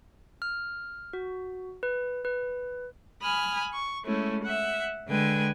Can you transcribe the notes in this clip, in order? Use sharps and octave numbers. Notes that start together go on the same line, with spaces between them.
F6
F#4
B4
B4
G#5 B5 D#6 F6
C#6
G#3 A3 C#4 E4
E5 F#5
D3 G#3 B4 G5 G#5